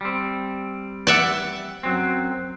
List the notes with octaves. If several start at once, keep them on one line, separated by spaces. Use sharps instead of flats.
G3 C4
D5 E5 F#5
F#2 F#3 C4